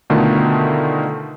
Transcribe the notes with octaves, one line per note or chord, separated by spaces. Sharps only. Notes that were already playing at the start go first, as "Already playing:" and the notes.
B2 D3 D#3 A3 F4